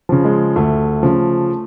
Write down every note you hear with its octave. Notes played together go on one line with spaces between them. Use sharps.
C#3 F3
G#3
D2 A3
C#3 F3